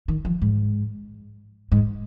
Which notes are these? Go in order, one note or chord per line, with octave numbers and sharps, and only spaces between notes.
D#3
F3
G#2
G#2